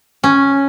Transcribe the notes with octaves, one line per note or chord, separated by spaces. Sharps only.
C#4